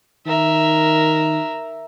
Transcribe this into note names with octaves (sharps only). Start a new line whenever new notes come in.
D#3 A#4 E5